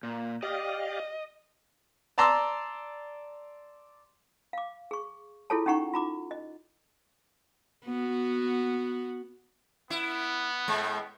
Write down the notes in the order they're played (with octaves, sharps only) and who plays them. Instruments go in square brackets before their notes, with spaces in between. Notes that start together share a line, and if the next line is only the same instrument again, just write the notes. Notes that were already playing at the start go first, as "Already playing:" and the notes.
[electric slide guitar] A#2
[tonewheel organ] G4 D5 F5 [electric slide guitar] D#5
[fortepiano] D5 A5 A#5 C6 D6 E6
[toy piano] F5 D6
G#4 C#6
E4 F4 G#4 A4 C#5 A5
C#4 D#4 G4 F#5 A#5 C#6
F4 A#5 D6
D#5
[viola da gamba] B3 F#4
[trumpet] B3 [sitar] E4
[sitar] A2 G#3